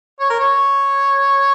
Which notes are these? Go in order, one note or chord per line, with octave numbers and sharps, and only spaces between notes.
C#5
A#4
C#5